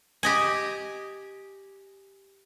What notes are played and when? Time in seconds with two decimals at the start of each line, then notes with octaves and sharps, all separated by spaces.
0.23 G4 D#5 G#5